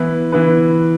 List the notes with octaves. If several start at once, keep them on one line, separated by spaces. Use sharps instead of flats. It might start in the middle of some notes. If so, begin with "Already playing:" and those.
Already playing: E3 B3 E4 B4
E3 B3 E4 B4